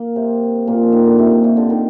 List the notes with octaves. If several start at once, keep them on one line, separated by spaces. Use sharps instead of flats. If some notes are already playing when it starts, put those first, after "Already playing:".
Already playing: A#3
C3 C4
A#2 A#3
F3
D#3
D3
C3
A#2
C3
D3
D#3